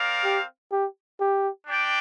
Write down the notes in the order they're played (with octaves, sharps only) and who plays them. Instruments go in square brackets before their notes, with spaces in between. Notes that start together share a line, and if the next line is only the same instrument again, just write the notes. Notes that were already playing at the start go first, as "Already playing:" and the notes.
Already playing: [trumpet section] C4 A#4 D5 F5
[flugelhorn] G4
G4
G4
[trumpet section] D4 G4 D5 G5